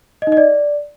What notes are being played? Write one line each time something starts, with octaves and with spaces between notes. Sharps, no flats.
D#5
D#4
D#5
D5